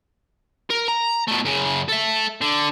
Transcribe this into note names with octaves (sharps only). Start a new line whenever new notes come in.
A#4
A#5
B2 A3
F#2 C#3
A4 E5
D3